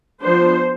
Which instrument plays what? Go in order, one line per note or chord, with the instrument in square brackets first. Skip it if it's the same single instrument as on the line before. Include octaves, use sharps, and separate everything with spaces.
[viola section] F3 B3 D4 C5